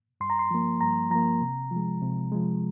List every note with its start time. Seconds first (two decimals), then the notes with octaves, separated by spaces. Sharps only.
0.21 G2 C6
0.30 A#5
0.39 C6
0.51 F3 A#3
0.81 G2 A#5
1.11 F3 A#3 A#5
1.41 C3
1.71 F3 G#3
2.02 C3
2.32 F3 G#3